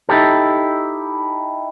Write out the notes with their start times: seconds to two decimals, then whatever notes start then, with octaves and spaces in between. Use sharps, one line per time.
0.09 D#4 E4 G4 A4